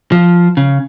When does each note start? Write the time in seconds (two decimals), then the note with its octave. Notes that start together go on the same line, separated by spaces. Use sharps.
0.12 F3
0.57 C#3